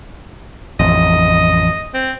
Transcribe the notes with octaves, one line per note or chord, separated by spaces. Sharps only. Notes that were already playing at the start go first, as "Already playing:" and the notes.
A1 F2 D#5
C4